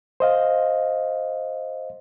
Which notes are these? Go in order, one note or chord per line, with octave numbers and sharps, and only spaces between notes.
C5 D#5 F5